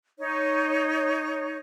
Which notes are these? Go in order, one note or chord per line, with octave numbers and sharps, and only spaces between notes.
D#4 C#5